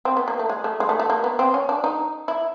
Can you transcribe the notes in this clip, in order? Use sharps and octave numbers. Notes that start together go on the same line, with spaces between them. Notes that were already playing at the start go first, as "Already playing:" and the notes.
C4
B3
A#3
A3
G#3
A3
G#3
A3
A3
A#3
B3
C4
C#4
D4
D#4
E4